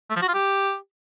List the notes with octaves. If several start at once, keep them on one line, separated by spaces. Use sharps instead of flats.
A3
F3
F#4
F4
G4